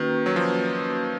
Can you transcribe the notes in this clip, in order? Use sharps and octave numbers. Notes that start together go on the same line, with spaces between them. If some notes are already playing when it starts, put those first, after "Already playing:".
Already playing: D#3 A#3 C#4 F#4 B4
F#3
F3